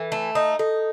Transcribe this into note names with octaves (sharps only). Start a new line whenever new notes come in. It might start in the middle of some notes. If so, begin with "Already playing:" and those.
Already playing: E3 A4
A3
D#4
D#4 A4